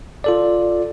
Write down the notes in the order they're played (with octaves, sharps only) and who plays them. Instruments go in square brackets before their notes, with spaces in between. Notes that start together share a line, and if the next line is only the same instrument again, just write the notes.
[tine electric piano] F4 A4 D5